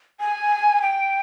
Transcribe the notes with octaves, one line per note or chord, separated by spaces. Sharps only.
G#5
G5